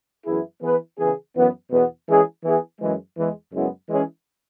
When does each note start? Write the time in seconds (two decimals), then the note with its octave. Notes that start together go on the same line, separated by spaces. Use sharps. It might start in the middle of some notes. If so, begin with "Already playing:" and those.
0.25 F#2 E3 B3 E4 G#4
0.61 E3 B3 G#4 B4
0.98 C#3 E3 B3 G#4
1.35 F#2 E3 B3
1.70 E2 B2 B3
2.07 E3 G#3 C#4 G#4
2.43 E3 B3 E4 G#4
2.80 F#2 E3 G#3
3.16 E2 E3 G#3
3.53 F#2 C#3 G#3 B3 E4
3.88 E3 G#3 C#4 G#4